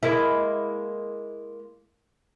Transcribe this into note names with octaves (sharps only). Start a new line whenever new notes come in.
G#3 A#3 E4